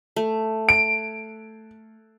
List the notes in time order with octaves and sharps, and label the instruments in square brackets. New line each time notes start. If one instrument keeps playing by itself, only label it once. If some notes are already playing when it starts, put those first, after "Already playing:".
[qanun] A3
[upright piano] D7